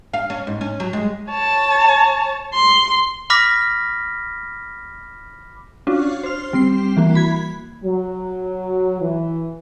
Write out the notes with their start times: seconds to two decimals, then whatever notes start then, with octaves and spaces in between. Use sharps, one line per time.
0.13 F5
0.30 C#4
0.47 G#2
0.61 C#4
0.80 F#3
0.93 G#3
1.31 C#5 A5
2.54 C6
3.30 B5 D6 F6 A#6 B6
5.87 C#4 D4 F4 F#4
6.23 C5 F6
6.53 G3 C4 C7
6.97 E3 A#3 F#4
7.15 B5 G#6
7.84 F#3
9.01 E3